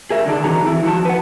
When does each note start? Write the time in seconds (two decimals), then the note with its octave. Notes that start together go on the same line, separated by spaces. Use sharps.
0.10 G#4 A#4 E5
0.26 D3 D#3 D4 D#4
0.44 E3 C4 F#4 G#4 A#5
0.63 E3 E4
0.83 F3 F#4 A5
1.05 B4 F#5